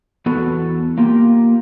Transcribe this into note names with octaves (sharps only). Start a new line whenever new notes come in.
E2 B3 E4 F#4 A4
A#3 F4 G4